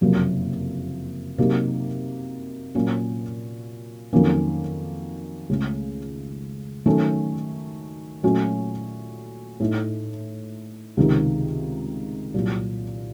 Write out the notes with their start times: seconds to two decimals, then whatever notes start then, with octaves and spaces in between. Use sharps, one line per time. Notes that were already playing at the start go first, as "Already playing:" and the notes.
0.01 F#1 F2 C3 F#3 A#3
1.38 C3 F#3 A#3 D#4
2.75 A#2 F#3 A#3 C#4
4.13 F2 D#3 F#3 A#3 C#4
5.49 C#2 C#3 A3 C#4
6.86 D#3 F#3 A3 C#4 A4
8.23 A#2 F#3 A3 C#4 F#4
9.60 A2 A3 D#4
10.97 C#2 C3 D#3
12.34 C2 A#2 F#3